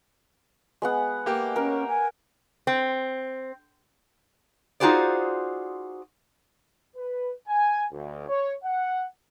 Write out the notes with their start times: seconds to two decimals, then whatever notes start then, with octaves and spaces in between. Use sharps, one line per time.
0.82 G#3 B3 F#5
1.26 A#3 G4
1.56 C#4 A#4
1.89 G#5
2.67 C4
4.80 D#4 F4 F#4 G#4 C5 D5
6.95 B4
7.48 G#5
7.92 D2
8.29 C#5
8.64 F#5